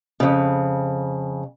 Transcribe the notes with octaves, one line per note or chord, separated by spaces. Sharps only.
F2 C#3